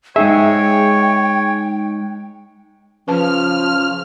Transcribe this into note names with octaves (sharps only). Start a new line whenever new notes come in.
G#3 D#4 G#4 C#5 E5 G5
C#3 F3 B4 A5 F6